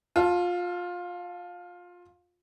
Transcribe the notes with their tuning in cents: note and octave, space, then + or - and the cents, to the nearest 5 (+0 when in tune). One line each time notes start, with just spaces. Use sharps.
F4 +20 F5 -30 A5 -10